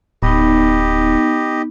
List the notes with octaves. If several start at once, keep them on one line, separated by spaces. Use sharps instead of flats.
D1 B3 D#4 G4 D#5